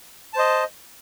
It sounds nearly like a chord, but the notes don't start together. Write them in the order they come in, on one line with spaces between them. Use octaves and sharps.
A5 C5 D#5